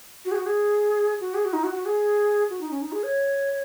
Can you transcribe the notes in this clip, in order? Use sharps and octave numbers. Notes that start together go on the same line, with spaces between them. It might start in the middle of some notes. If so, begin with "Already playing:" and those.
F#4
G#4
F#4
G#4
F#4
G#4
F#4
D#4
F#4
F#4
G#4
F#4
D#4
C#4
D#4
G#4
C#5